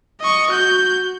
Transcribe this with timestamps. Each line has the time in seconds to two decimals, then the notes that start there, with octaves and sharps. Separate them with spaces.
0.21 D#5 C#6
0.51 F#4 G6